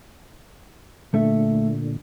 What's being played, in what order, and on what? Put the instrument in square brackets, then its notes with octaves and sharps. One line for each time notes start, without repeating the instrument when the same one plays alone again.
[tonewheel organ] A#2 D3 [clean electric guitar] A3 A4 E5